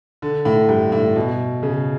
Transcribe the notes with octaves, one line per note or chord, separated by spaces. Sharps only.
D3
A2
G2
A2
B2
C#3